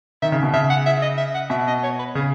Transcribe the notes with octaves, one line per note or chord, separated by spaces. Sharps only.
D#3 E5
C#3
B2
C#3 E5
F#5
E5
D#5
E5
F#5
B2 E5
D#5
C#5
B4
C#3 G#4